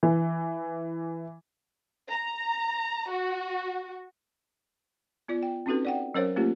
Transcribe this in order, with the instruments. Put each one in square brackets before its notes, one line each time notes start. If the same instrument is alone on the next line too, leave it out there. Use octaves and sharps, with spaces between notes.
[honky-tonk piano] E3
[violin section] A#5
F#4
[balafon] B3 F4 D5
G5
C4 C#4 D#4 F#4 A4 B4
D5 F#5 G5
F#3 C#4 A#4 C5 C#5 F5
A3 A#3 C#4 F4 G4